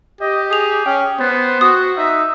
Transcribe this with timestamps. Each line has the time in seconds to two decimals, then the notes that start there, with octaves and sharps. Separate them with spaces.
0.21 G4 D#5
0.50 G#4 D#6 F7
0.86 C#4 G5
1.20 B3 C5
1.61 F#4 D#6
1.97 D#4 E5